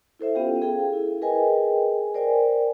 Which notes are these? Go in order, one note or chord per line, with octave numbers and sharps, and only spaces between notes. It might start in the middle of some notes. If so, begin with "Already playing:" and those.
E4 A4 C5 E5
B3 C#4 F4 G4 F5 G5
G#4 A4 F5 G5
E4
G#4 A#4 B4 D#5 G5 G#5
A#4 C5 D5 G5 G#5